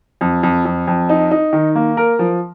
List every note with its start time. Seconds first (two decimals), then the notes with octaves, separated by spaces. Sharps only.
0.21 F2
0.43 F2
0.65 F2
0.87 F2
1.09 D#4
1.31 D#4
1.53 D#3
1.75 A#3
1.97 A#4
2.19 F3